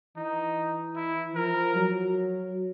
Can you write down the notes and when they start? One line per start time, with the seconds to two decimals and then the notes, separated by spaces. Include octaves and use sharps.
0.17 E3 D#4
0.96 E4
1.35 F3 A#4
1.76 F#3